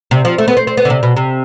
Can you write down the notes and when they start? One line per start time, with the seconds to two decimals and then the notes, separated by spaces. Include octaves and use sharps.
0.11 C3
0.25 F3
0.38 A3
0.48 B3
0.57 C4
0.67 C4
0.77 B3
0.85 D3
0.90 C3
1.03 B2
1.16 C3